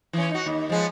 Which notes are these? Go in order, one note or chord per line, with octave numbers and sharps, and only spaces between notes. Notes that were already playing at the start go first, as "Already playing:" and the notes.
E3 C#4
D#4 F#4
D#2
F3 G#3 B3